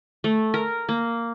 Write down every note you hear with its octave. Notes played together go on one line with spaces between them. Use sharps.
A3
A#4
A#3